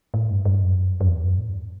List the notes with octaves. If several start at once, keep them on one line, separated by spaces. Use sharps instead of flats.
A2
G2
G2
F#2
F#2
E2
F#2
A2
G2